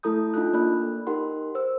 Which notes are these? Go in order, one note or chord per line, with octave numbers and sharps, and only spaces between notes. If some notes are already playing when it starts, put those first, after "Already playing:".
A3 E4 A4 A#5 D#6 G6
D4 D#4 F4 A4 F#6
A#3 D5 B5 F#6
D#4 G4 A#4 F#5 C6
C5 E6